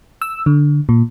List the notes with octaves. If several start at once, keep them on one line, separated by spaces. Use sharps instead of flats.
E6
D3
A#2